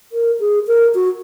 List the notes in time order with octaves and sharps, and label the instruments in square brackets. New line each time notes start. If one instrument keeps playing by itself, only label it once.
[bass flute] A#4
G#4
A#4
F#4